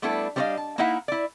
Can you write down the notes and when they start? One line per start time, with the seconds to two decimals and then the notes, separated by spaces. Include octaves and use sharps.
0.02 G3 A3 B3 D4 E4 A4
0.36 G3 D4 C5 C#5 D#5 F5
0.57 A5
0.78 A#3 D#4 E4 E5 F#5
1.08 E4 D5